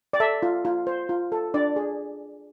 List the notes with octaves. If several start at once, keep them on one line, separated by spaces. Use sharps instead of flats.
D5
A4 E5
F4
F4
C5
F4
A4
D4 D5
G#4